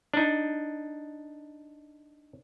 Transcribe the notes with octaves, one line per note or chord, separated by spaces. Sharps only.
D4 D#4